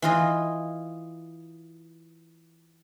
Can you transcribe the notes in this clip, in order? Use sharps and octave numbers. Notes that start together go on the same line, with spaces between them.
E3 F4 D#5